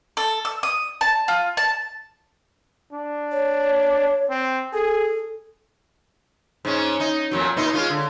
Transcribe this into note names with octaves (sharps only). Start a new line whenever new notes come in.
A4
E6
D#6
A5
F4
A5
D4
C#5
C4
G#4 A4
G#2 C#4
D#4
F2 A#2 F#3
A#2 D#4
G#3 C#4 F4
D3